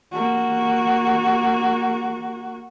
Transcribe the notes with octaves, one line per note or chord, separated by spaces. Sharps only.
A#3 F#4